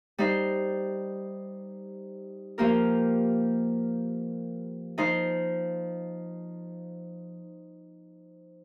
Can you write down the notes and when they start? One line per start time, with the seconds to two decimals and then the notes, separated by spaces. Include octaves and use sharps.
0.18 G3 D#4 C5
2.58 F3 A#3 G4 A#4
4.98 F3 D#4 C5